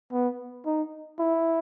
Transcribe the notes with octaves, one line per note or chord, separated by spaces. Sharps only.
B3
D#4
E4